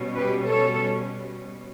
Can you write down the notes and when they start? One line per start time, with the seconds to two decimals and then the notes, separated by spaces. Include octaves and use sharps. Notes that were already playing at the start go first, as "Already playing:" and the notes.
Already playing: B2 G3 C#4
0.17 G4 B4
0.45 A4 C#5